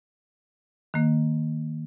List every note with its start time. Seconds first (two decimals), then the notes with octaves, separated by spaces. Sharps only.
0.94 D#3 A#3